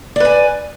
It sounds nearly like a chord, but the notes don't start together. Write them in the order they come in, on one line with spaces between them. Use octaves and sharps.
D5 B4 G#5